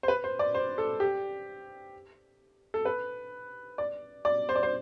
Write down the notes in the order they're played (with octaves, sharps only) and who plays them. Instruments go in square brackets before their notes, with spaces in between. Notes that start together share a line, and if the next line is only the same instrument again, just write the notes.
[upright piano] C5
B4
C5
D5
C5
A4
G4
A4
B4
D5
D5
C5
D5
C5